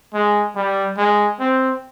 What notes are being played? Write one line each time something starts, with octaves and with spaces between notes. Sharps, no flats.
G#3
G3
G#3
C4